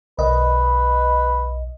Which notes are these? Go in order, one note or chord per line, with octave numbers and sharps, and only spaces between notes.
B1 B4 D#5